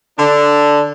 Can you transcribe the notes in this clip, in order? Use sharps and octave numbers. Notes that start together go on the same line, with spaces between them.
D3 D4